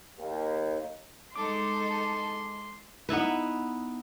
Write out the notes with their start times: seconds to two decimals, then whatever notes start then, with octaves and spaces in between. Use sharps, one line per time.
0.18 D#2
1.36 G#3 D#4 A4 C6 D6
3.09 B3 D#4 E4 B4